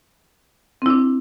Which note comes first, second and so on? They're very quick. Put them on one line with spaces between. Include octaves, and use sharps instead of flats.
C4 E4 D4